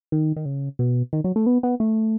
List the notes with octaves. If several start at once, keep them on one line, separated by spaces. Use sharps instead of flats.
D#3
D#3
C#3
B2
D#3
F#3
A3
B3
B3
A3